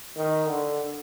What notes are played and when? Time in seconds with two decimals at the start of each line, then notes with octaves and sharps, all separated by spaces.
0.17 D#3
0.48 D3